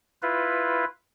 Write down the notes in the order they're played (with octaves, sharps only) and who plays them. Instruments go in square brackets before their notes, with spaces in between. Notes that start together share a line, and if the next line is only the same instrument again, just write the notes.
[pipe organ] E4 F4 B4